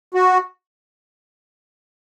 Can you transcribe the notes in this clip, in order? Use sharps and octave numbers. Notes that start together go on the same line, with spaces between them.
F#4